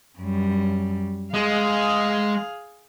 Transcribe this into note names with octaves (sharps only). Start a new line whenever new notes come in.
F#2 G3
G#3 G#4 F5